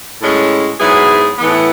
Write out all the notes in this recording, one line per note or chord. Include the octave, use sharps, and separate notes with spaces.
A2 G#3 C#4
G#2 F#3 B3 E4 G#4
A2 E3 B3